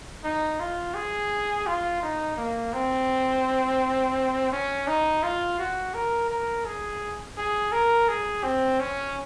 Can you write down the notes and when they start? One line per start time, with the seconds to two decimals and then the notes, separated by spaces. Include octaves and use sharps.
0.24 D#4
0.60 F4
0.94 G#4
1.67 F4
2.03 D#4
2.37 A#3
2.73 C4
4.52 C#4
4.88 D#4
5.23 F4
5.59 F#4
5.94 A#4
6.29 A#4
6.65 G#4
7.38 G#4
7.72 A#4
8.09 G#4
8.44 C4
8.80 C#4